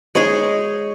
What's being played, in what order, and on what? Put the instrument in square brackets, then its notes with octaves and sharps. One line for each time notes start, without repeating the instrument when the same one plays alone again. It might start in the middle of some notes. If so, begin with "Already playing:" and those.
[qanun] G#3 D#4 G#4 [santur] C#5